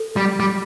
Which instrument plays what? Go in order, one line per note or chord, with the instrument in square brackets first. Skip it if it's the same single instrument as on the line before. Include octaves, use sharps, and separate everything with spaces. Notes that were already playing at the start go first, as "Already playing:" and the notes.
Already playing: [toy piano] A4
[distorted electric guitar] G3
G3